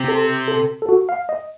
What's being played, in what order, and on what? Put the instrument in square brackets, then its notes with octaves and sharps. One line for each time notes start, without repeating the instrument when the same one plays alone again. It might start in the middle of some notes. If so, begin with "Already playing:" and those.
Already playing: [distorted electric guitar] C3
[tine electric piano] A4
A4
A4
F#4
F5
D#5